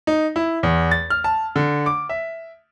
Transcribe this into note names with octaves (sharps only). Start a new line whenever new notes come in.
D#4
E4
E2
A6
F6
A5
D3
D6
E5